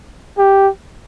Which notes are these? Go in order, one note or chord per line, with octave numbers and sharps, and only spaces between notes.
G4